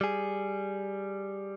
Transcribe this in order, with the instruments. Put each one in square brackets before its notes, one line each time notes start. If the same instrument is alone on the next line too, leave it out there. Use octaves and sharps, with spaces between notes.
[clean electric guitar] G3 G#4